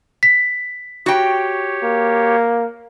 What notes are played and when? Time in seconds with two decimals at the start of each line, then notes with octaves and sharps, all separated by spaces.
0.23 B6
1.06 F#4 G4 C#5 G5
1.83 A#3